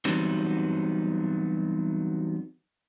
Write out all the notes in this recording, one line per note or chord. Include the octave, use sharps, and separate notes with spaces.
E3 F#3 G3 B3 C4 D#4